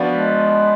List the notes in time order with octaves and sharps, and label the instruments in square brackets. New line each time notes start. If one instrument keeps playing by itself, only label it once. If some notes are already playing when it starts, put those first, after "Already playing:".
Already playing: [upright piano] F3 B3 D4 F#4 B4
[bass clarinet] G#3